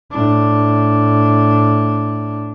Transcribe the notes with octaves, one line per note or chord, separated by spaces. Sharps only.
A2 D4